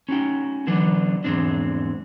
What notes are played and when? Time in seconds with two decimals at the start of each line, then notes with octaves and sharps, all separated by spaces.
0.09 C#4 D#4 F#4 G5
0.67 D3 E3 F#3 B3 D4
1.24 E2 G#2 G#3 C4 D4